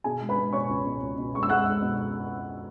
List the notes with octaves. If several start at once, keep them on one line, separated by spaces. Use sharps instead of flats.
B2 G#4 G#5
G#3
B4 B5
G#3
B2 C#5 C#6
C#2
B2
C#2
B2
G#3 C#6
E6
G#3 F#5 F#6
G#3
B2